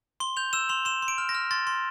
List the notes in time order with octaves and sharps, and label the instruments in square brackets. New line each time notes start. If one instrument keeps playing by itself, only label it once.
[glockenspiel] C6 G7
G6 F7
E6 E7
C6 F7
C6 E7
C6
D7
F6
A#6
F6
C6 A6
C6